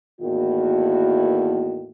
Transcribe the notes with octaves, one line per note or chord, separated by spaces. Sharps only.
E2 A2 D#3 A#3 F#4